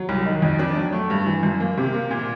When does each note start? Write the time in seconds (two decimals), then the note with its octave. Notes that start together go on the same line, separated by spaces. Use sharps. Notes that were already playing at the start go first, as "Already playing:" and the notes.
Already playing: F#3
0.09 C2
0.26 D#3
0.42 F2
0.59 D4
0.76 F#3
0.93 A3
1.10 G2
1.26 E3
1.43 F#2
1.60 A#3
1.77 C3
1.94 A#3
2.11 A#2